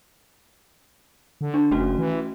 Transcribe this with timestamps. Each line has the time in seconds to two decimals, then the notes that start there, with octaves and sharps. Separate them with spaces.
1.41 D3
1.54 D4
1.71 F#1 A3 C#4 F#4
1.98 E3